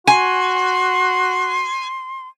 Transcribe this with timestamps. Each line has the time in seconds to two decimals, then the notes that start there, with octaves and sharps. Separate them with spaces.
0.07 F#4 G#5 C6